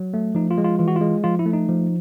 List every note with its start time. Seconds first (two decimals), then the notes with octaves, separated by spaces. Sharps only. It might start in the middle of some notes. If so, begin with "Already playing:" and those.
Already playing: F#3
0.14 A3
0.35 F3 D#4
0.51 F4
0.58 G#3
0.64 F4
0.79 E3 F4
0.88 F#4
0.96 F4
1.01 G#3
1.24 F3 F4
1.39 E4
1.46 A3
1.53 D#4
1.69 F3